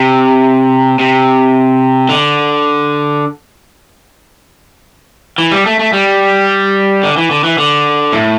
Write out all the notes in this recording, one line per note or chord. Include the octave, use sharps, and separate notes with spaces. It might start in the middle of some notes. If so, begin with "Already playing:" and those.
Already playing: C3
C3
D3
E3
G3
A3
A3
G3
D3
E3
D3
E3
D3
A2